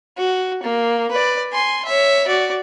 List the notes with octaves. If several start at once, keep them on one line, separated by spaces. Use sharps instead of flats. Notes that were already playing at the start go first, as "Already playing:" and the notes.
F#4
A#3
B4 D5
G#5 C6
C#5 E5
F#4 D5